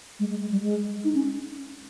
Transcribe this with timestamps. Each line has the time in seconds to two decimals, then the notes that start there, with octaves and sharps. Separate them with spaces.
0.20 G#3
0.30 G#3
0.41 G#3
0.51 G3
0.62 G#3
1.04 D#4
1.15 C#4